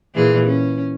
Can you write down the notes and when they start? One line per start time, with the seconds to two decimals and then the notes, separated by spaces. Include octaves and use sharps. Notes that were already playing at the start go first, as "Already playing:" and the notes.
0.15 A#2 E3 G#4
0.47 C#4